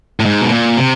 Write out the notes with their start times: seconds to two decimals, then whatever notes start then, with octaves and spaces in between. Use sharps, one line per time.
0.20 A2
0.26 G#2
0.41 B2
0.51 A#2
0.77 C3